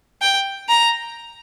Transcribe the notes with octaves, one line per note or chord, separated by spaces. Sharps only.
G5
A#5